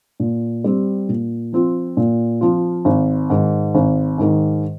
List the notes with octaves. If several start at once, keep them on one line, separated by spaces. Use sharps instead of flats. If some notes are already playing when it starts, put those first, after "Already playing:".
A#2
G3 C4
A#2
F3 C4 F4
A#2
F3 C4 F4
G#1
G#2 D#3
G#1
G#2 D#3